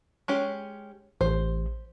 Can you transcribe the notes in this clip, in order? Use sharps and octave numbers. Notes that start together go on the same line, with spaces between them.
G#3 C#4 G4
A1 C5